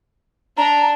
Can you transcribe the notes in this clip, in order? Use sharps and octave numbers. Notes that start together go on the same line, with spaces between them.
D4 A#5